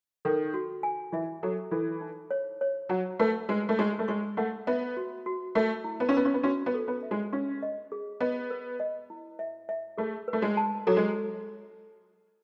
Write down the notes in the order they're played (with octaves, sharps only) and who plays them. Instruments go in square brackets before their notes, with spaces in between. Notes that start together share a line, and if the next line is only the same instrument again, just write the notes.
[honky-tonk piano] D#3 [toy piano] A4
[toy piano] F#4
G#5
[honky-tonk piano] E3 [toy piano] E5
[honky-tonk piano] F#3 [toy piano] A4
[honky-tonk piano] E3 [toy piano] A4
[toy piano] D#4
C#5
C#5
[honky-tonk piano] F#3 [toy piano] F#5
[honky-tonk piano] A3 [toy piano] B4
[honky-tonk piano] G#3 [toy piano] B4
[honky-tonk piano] A3
[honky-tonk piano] G#3 [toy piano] C#6
[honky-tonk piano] A3
[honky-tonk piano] G#3 [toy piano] C#6
[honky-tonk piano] A3 [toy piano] F#5
[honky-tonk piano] B3 [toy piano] E5
[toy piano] F#4
F#4
[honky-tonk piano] A3 [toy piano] E5
[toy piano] E4
[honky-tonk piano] B3
C#4
[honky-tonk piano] B3 [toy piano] B4
[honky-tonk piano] C#4
B3
[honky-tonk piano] C#4 [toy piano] F#4
[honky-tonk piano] B3
[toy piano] A4
[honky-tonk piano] B3
[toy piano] E5
[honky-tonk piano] G#3
[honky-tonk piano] C#4 [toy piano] C#6
[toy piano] D#5
G#4
[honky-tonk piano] B3 [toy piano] D#5
[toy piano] B4
D#5
E4
E5
E5
[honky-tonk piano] A3 [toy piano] G#4
[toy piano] B4
[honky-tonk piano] A3
G#3
[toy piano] A5
[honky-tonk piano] F#3 [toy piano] A4
[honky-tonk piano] G#3